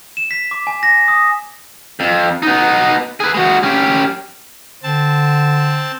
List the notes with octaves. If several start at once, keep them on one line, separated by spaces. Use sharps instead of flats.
E7
B6
D6
G#5
A#6
D#6
F2
B3 D#4
G#4 B4
G#3 F#4
C#4 G4
D3 C4 A5